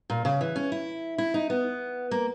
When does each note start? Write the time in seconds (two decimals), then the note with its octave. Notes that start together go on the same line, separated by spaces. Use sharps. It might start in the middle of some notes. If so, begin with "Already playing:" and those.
0.10 A#2
0.25 C#3
0.41 E3
0.56 C#4
0.72 E4
1.18 E4
1.34 D#4
1.50 B3
2.11 A#3